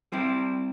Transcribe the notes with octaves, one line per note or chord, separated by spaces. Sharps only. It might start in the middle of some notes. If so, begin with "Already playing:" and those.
G3 C4 E4 G4